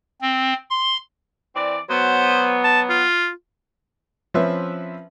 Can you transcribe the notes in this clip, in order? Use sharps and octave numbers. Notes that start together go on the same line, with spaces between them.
C4
C6
E3 C4 D5
F#3 B3 C5
A5
F4
F3 C4 C#4 B4 E5